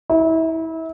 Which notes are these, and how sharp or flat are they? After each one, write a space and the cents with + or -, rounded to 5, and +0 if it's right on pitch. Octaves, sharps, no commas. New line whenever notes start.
E4 -30